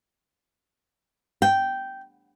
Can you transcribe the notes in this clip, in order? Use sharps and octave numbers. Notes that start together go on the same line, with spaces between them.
G5